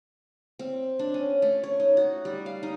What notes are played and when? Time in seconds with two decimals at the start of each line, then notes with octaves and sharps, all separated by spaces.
0.59 C4
0.99 D4
1.14 C#4
1.42 A3
1.63 C#5
1.80 D#4
1.97 F#4
2.25 G3
2.46 F5
2.63 D#4